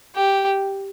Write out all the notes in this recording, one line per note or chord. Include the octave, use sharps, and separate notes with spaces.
G4